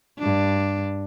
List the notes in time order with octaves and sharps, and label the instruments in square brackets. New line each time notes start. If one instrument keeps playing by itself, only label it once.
[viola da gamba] G2 D4